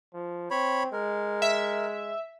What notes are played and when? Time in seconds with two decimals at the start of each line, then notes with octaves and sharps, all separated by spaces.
0.14 F3
0.51 C4 C#5 B5
0.93 G#3 A#4
1.42 E5